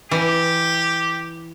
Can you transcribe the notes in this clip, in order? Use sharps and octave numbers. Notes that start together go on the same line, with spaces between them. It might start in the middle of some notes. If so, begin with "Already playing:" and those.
E3 G4